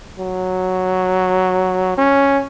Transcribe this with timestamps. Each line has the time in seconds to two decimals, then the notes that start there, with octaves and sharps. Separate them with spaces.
0.19 F#3
1.98 C#4